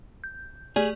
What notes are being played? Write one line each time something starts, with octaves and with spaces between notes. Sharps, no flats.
G6
A3 G4 G#4 D5